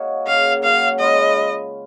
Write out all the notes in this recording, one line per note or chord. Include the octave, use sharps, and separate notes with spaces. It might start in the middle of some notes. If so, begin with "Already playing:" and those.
Already playing: A#3 D#4 F#4 C#5
C#3 F#3 A#3 F5
C#3 F#3 A#3 F5
G#3 C#4 F4 B4 D#5